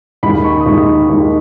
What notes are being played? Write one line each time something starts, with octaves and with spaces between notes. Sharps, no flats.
D#2 D#3 G#3 B5
C#6
D#6
D#2 D#3 G#3 C#6
D#2 D#3 G#3